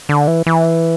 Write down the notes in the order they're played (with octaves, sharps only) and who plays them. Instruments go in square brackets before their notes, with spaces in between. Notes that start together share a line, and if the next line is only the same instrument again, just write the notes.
[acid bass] D3
E3
E3